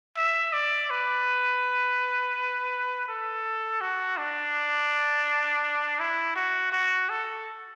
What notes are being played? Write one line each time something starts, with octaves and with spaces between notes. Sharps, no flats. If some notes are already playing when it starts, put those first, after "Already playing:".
E5
D5
B4
A4
F#4
D4
E4
F#4
F#4
A4